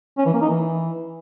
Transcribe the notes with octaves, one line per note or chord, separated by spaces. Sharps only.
C#4
E3
A#3
D#4
E3